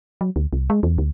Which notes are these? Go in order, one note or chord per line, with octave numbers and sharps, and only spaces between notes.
F#3
D2
C2
G#3
E2
D2